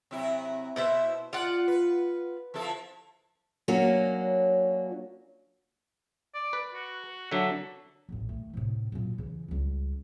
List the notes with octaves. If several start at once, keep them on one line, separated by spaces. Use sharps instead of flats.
C3 F#3 E4
B2 B3 E4 C5 E5
F4 D5 F#5
B4
F3 E4 A4
F#3 A#3 C#4 D4 F#4
D5
B4
F#4
D3 F#3 D4 E5
D#1 A1
D#3 A3
A2 C3
F#2 A#2
C#3 E3
C#2 G3